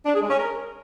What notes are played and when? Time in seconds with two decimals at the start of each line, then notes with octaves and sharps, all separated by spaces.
0.06 D4
0.14 G#4
0.22 G#3
0.30 C#4
0.38 A#4